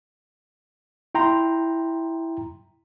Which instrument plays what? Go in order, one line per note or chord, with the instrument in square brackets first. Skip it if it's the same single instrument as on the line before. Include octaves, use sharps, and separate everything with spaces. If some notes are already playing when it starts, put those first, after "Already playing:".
[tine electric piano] E4 G5 A#5 C6